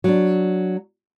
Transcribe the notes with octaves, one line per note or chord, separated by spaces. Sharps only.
F#3 D4